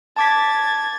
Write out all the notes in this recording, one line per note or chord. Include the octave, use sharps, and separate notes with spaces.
A5 D6 G#6 A6 B6